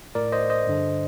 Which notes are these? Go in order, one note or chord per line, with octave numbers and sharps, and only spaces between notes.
A2 A#4 D5
C5 D#5
C5 D#5
G2 D3